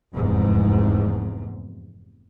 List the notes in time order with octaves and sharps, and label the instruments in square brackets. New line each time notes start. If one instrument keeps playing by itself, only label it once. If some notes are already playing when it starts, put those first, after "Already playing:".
[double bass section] F1 E2 G#2